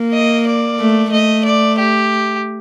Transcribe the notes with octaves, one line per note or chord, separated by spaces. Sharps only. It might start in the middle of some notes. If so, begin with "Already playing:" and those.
Already playing: A#3
D#5
D5
A3
A3 D#5
D5
G4